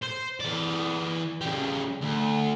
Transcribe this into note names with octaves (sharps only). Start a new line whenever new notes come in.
C5
E3 D5
C#3 G3
D2